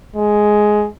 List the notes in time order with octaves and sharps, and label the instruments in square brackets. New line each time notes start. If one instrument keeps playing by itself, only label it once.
[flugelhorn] G#3